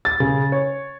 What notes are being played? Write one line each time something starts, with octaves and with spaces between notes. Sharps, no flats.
A6
C#3
C#5